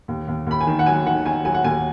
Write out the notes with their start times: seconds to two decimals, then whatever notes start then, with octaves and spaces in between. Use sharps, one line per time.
0.08 D#2
0.28 D#2
0.47 D#2 B5
0.61 G#5
0.67 D#3
0.79 F#5
0.86 F#3 G#5
1.06 D#3 F#5
1.25 D#3 G#5
1.45 F#3 G#5
1.54 F#5
1.64 D#2 G#5